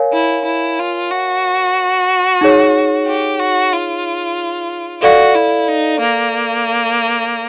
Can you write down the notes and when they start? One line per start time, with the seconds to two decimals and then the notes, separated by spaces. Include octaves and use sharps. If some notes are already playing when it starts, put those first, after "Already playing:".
Already playing: A#4 C#5 F5 G#5
0.13 E4
0.45 E4
0.79 F4
1.11 F#4
2.41 D#4 G#4 C#5
3.07 G4
3.39 F#4
3.73 F4
5.02 F#4 A4 D5 F5
5.35 E4
5.68 D#4
6.00 A#3